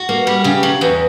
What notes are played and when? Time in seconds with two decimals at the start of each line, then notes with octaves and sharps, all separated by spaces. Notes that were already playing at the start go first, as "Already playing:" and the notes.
Already playing: F#4
0.09 A#3
0.27 G3
0.44 C#3 G4
0.63 F#3
0.81 E2